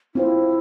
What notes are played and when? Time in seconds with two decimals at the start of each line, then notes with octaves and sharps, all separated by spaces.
0.15 C4 E4 F4 C5